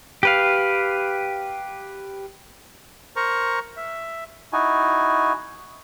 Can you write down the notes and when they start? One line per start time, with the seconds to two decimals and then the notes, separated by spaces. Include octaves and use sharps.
0.23 G4 B4 F5
3.16 A#4 C5 A#5 C#6
3.77 E5
4.53 D#4 E4 F#4 G#5